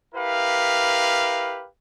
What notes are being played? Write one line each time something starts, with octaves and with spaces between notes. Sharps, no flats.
E4 G4 A#4 B4 F5